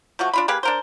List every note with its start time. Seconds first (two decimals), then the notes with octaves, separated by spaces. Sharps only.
0.19 F3 A3 F#4
0.33 D4 F4 B5
0.48 A#3 G4 G#4 B4
0.63 D4 A#4 C5